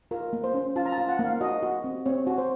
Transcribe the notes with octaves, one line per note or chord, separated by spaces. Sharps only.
F4 A#4
A#3
C5
C#4
F4 A5
A#5
A5
F4
F#5
A#3
F5
F#4 D#5
F#4
C4
C4 C#5
F#4
C5